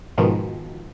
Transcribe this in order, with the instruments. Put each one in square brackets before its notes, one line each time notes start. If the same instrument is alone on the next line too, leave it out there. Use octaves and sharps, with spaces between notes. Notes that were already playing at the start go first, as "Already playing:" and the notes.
[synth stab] G#2 B2 D#3 F3